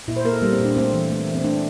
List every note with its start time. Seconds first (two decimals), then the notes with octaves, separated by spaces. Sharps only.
0.08 A#2 E4
0.16 C5
0.24 A#3 A#4
0.33 A4
0.42 G3 A#3
0.53 C4
0.59 A#2
0.65 D4
0.76 A3 C4
0.94 E3
1.10 A3
1.27 E3
1.35 C4
1.44 A3 D4